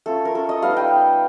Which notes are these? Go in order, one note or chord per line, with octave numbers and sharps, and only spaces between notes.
A3 C#4 F4 A4
A#4
A4
D#5
G3 B3 D#4 F5
G5